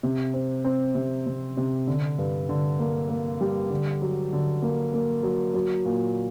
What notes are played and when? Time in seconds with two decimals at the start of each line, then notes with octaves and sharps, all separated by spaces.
0.03 C3
0.34 C4
0.65 C4
0.95 C3
1.27 C3
1.57 C3
1.87 D3
2.18 G2
2.49 D3
2.79 A#3
3.09 A#3
3.41 G3
3.71 D3
4.02 F#3
4.33 D3
4.62 A#3
4.94 A#3
5.23 F#3
5.54 F#3
5.85 A#2